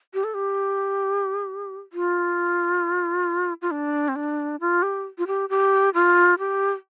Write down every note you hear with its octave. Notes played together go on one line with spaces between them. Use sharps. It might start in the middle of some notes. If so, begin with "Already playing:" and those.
G4
A4
G4
F4
F4
D4
C4
D4
F4
G4
F4
G4
G4
F4
G4